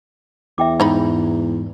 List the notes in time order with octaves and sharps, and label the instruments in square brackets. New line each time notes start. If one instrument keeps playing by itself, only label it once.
[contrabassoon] E2 [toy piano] E5 G5 D6
[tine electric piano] G#2 [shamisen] G#3 D#4 B5